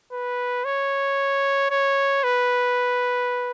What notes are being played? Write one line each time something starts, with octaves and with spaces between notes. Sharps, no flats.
B4
C#5
C#5
B4